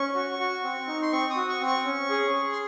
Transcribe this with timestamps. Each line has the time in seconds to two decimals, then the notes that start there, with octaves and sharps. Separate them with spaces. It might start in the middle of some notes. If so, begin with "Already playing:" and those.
Already playing: C#4 C#6
0.15 F#4
0.39 F#4
0.63 C4
0.87 D#4
1.02 C6
1.12 C4 C#6
1.30 D#6
1.36 F#4
1.49 C#6
1.61 C4
1.66 C#6
1.85 C#4
2.10 G#4
2.33 G#4
2.52 C6